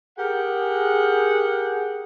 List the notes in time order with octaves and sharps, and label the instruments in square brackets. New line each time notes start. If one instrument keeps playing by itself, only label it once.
[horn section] G4 G#4 A#4 F#5